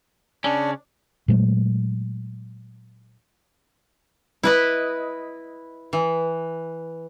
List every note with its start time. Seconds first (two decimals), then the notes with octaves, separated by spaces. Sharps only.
0.44 C#3 C#4 D4
1.28 A#2 F#3 G#3 A3
4.43 E4 B4 D#5
5.93 E3